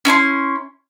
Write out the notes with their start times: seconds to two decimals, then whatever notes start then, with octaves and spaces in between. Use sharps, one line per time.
0.05 C#4 E4 A#5 C6